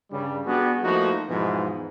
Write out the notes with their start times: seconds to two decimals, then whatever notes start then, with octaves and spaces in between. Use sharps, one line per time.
0.12 G2 C#3 G3
0.46 G3 B3 D4 F#4 G#4
0.83 F3 A3 A#3 D#4 E4 F#4
1.29 E2 G#2 B2 E3 F3